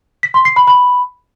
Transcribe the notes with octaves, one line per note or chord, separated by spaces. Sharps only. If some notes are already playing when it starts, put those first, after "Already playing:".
B6
C6
C7
B5
B5